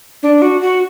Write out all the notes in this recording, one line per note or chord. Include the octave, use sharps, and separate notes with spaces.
D4
F#4
F#4